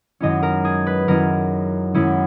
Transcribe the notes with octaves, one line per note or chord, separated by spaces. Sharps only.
F#2 D#3 G#3 C#4 E4 D#5
A#4
G#4
B4
F#2 D#3 G#3 C#4 E4 A#4
F#2 D#3 G#3 C#4 E4